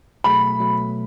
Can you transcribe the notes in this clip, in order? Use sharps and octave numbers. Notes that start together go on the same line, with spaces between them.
B2 F#3 A3 B5
B2 F#3 A3